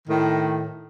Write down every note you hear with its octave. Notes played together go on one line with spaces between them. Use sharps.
A2 D#3